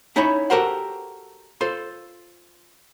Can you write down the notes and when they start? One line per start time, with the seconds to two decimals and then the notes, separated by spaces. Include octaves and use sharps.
0.16 C#4 D#4 E4 C#5 B5
0.50 F#4 G4 A4 A#4 C5 F#5
1.61 F4 A4 C5